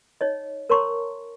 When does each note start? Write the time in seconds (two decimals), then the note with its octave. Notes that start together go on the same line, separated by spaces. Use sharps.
0.21 D#4 C#5 D#5
0.69 A#4 C#5 A5 A#5 C6 C#6